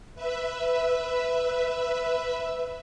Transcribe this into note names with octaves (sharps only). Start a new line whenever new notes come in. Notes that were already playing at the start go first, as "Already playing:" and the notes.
B4 E5